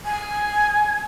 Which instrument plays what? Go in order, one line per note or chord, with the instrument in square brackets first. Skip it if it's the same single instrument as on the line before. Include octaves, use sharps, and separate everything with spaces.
[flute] G#5